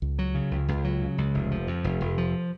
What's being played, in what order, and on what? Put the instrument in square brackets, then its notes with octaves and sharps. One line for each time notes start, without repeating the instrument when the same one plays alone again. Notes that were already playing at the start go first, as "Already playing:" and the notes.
[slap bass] C#2
F#3
C#3
C#2
C#2
F#3
C#3
C#2
F1
F3
F2
F1
F1
F3